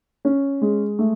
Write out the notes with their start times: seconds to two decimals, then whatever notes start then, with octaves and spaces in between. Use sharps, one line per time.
0.25 C#4
0.62 G#3
0.99 A3